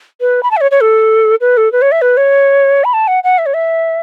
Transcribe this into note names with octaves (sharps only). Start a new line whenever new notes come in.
B4
B5
A5
E5
C#5
C#5
A4
B4
A4
B4
C#5
E5
B4
C#5
B5
A5
F#5
F#5
E5
C#5
E5